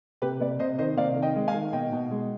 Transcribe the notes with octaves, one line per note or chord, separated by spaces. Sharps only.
C3 G4 B4
C3 B4 D5
C3 C5 D#5
D#3 C5 D#5
C3 D5 F5
D#3
D#5 G5
G#3
F5 G#5
D#3
B2 D#5 G5
B2
G#3